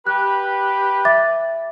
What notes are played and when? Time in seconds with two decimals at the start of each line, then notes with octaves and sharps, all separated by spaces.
0.07 G4 B4 F#6
1.05 E5 D6 A6